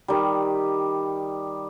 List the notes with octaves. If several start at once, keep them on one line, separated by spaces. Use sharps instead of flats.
D#3 G3